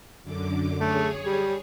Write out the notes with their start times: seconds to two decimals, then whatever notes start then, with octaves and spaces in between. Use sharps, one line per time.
0.23 F#2 D3 D6
0.80 A3 G#4 C#5
1.26 G3